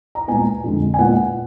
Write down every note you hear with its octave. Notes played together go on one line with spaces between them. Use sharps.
A#5
A#2 G#3 B3 G#5
F2 D3 G#3
G#5
A#2 G#3 B3 F#5